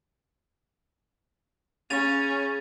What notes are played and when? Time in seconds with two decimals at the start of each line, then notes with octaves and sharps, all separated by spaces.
1.90 C#3 C#4 A6 D#7 F7